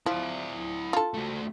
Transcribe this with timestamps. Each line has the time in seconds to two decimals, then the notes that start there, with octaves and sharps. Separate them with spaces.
0.06 F3 E4 D5
0.93 F4 A4
1.14 A3 F#4